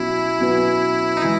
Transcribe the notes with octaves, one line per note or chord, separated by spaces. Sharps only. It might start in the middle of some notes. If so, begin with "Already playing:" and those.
Already playing: B2 F#3 C#4 E4 F#4
B2 F#3 C#4 F#4 B4
D#4
E3 G#3 E4